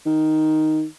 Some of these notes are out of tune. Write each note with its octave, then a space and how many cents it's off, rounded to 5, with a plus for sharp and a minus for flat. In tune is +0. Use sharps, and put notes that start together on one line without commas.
D#3 +0